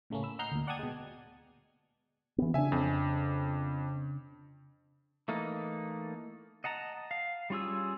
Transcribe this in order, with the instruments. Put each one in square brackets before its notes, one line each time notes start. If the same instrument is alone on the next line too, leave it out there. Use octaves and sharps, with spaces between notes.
[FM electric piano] A2 C#3 A3 A#3 C#4
B5 E6
D#5 F#5 A#5 F6 G6 C7
D2 A#2
D5 F#5 G5 A5 D#6 G#6
B2 G#3
[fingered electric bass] E3 B3
[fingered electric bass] C#3 D4 [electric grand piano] E5 G#5
[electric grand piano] F2
[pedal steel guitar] E3 A3 A#3 D#4
D#5 F#5 A5 A#5
F5
G3 C#4 F4 G#4 E6